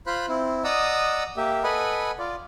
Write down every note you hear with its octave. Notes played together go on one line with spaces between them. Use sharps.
F4 C5 B5 F#6
C4 E4
D5 D#5 F#5 A#5 D#6 E6
A#3 G4 E5
A4 B4 D#5 F#5 G#5 B5
F4 D5